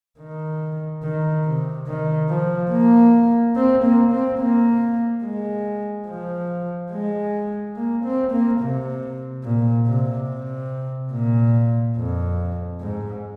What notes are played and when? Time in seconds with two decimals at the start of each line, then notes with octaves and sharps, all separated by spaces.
0.19 D#3
1.03 D#3
1.46 C3
1.87 D#3
2.29 F3
2.72 A#3
3.56 C4
3.84 A#3
4.12 C4
4.39 A#3
5.24 G#3
6.08 F3
6.92 G#3
7.76 A#3
8.05 C4
8.31 A#3
8.60 C3
9.44 A#2
9.87 C3
10.29 C3
11.13 A#2
11.97 F2
12.81 G#2